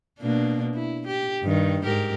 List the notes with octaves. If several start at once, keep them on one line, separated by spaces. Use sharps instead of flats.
B2 A#3 D4
E4
G4
G2 D#3
G#2 G4 A#4